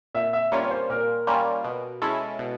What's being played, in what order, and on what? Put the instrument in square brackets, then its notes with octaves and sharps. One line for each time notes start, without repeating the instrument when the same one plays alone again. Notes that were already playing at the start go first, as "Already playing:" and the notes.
[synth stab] A#2 [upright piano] E5
[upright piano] E5
[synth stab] G3 A#3 C#4 F4 [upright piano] C#5
[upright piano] C#5
C5
[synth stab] A#2 [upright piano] A#4
[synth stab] G3 A#3 C#4 F4
B2
G#3 C#4 E4 A4
B2